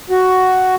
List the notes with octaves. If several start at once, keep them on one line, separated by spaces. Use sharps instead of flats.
F#4